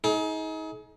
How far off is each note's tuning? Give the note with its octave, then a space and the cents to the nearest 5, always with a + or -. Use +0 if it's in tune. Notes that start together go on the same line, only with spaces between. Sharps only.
D#4 +35 G#4 +35